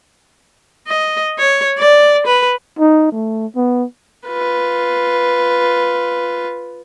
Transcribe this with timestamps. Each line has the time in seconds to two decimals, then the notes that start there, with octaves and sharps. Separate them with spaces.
0.88 D#5
1.38 C#5
1.79 D5
2.27 B4
2.79 D#4
3.12 A3
3.56 B3
4.28 F4 B4